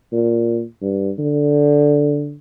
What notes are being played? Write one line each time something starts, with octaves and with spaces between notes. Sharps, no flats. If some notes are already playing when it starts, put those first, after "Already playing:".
A#2
G2
D3